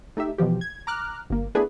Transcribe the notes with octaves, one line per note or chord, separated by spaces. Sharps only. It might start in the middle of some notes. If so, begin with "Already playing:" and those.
A3 D#4 G4 E5
B2 E3 F3 G4
G#6
A#5 D6 F6 F#6
G1 A#3
A3 B3 D4 E4 G#4 B4